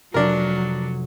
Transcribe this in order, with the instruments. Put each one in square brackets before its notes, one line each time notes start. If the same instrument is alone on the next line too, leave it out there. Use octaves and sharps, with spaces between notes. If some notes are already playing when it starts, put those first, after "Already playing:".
[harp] F1 [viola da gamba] F#3 [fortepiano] D4 A#4